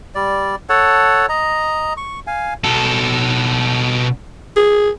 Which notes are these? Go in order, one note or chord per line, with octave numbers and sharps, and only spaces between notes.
G3 D5
A4 C#5 F#5 A5
D#5 A#5
C#6
F5 G#5
B2 A4
G#4